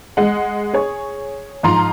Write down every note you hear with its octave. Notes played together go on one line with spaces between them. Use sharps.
G#3 F#5
G#4 C#5
G#2 F3 F4 A#5 C6